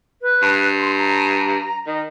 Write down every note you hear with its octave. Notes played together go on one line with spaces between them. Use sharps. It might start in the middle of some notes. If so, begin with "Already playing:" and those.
B4
G2
C6
A#5
D#3 D#5